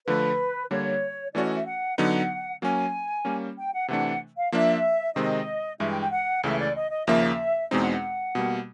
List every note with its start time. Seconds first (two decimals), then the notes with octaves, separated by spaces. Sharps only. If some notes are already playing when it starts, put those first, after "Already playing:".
0.07 D3 F3 A3 B4
0.70 D3 G3 A#3 C#5
1.34 E3 A3 C#4 F#4 D5
1.45 D#5
1.55 E5
1.66 F#5
1.97 D3 F#3 B3 D#4 F#5
2.62 F#3 A#3 C#4 G#5
3.25 G3 A#3 C#4
3.57 G5
3.73 F#5
3.88 C3 E3 A3 D4 F#5
4.37 F5
4.52 F3 A#3 D4 E5
5.16 C3 D#3 G#3 C4 D#5
5.79 G2 E3 G#3 E5
5.90 G5
6.01 G5
6.12 F#5
6.43 C#2 C#3 E3 A3 E5
6.59 D5
6.76 D#5
6.91 D#5
7.07 D#2 C#3 F3 A#3 E5
7.71 E2 B2 G#3 C4 D#4
7.81 F#5
7.92 F#5
8.35 B2 G3 A#3